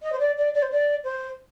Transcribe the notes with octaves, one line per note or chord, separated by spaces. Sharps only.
D#5
C5
D5
D5
D5
C5
D5
C5